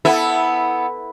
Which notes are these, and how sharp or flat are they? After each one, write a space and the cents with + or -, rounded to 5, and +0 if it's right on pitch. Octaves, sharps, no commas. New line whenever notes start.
B3 +0 E4 -10 A4 +0